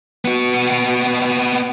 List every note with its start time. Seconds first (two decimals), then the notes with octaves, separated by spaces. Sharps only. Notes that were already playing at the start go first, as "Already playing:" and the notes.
0.25 B3 F#4